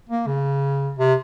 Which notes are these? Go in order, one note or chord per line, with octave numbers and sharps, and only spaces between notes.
A#3
C#3
C3